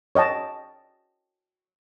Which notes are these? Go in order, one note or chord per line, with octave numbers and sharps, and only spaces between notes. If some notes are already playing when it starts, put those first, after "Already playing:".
C#5 D#5 G5 A5